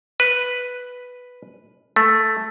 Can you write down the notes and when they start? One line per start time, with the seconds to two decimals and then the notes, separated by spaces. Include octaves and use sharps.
0.20 B4
1.96 A3